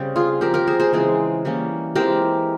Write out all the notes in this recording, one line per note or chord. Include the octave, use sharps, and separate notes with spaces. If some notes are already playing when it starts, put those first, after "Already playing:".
Already playing: C#3 G3 C4
F4 G#4
F3 C4 G4 A#4
G4 A#4
G#4 C5
G#4 C5
C#3 E3 G#3 C4 G#4 C5
E3 G3 A#3 C#4
E3 G#3 C4 G4 A#4